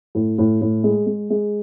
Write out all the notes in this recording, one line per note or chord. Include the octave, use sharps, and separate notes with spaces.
A2
A2
A2
G#3
G#3
G#3